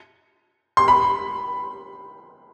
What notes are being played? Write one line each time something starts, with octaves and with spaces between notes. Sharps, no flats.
C6
B5